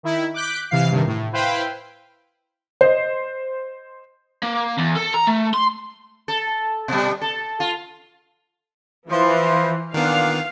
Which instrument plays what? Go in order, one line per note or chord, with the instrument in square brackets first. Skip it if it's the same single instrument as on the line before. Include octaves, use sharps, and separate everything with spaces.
[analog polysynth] D#3 E4
D6 F#6 G6 B6 D7
C3 E3 F5 C7
G2 C3 D#3
A2
E4 B4 C5 F5 G5 B5
[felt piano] C5 D#5
[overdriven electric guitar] A#3
E2
A4
A#5
A3
C6
[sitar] A4
B2 G3
A4
F4
[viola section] E3 [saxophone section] F3 [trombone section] E4 C5
[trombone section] A#2 [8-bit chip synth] D#3 B3 [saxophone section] D4 [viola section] F5